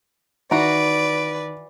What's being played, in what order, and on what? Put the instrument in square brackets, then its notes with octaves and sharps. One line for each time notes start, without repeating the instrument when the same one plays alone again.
[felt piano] D#3 [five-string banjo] E3 F#4 A#5 [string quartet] B4 D5 [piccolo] D7